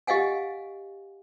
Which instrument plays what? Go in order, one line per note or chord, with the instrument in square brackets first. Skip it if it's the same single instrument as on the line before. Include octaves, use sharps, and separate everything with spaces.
[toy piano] G4 D#5 F5 F#5 G#5